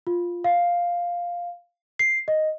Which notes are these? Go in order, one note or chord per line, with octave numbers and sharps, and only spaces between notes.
F4
F5
C7
D#5